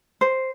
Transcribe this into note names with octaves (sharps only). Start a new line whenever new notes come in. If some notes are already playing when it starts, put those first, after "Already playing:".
C5